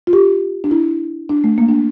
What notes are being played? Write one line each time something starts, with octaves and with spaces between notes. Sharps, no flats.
F4
G4
D4
E4
D4
A3
A#3
D4